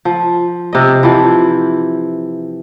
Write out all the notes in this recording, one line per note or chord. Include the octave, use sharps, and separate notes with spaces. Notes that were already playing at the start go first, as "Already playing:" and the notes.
F3
C3 D#5
E3 F3